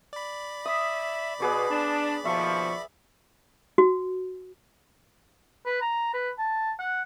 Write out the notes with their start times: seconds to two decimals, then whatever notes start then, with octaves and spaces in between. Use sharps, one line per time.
0.13 D5 B5
0.65 E5 D#6
1.40 B2 B3 G#4 C#5 D6
1.70 D4 A5
2.25 D#2 B2 F3 E5 C#6
3.78 F#4
5.66 B4
5.82 A#5
6.14 B4
6.39 A5
6.79 F#5